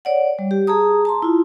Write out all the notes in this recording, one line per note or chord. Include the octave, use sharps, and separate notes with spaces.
C#5 D5 F#5
G3
G4
G#4 A5 A#5 D#6
A5 A#5 C6
E4 F4